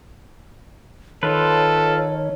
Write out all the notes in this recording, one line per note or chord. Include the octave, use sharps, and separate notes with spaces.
D#3 F4 A4 B4 C#5